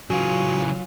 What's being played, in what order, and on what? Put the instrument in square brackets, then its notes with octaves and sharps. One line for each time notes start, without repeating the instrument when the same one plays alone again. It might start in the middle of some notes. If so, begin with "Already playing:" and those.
[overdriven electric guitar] C#3 E3 [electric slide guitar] F#3 F4 [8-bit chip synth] F#4 [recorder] G#5